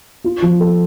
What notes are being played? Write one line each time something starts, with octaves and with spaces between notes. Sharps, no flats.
F4
F3
A4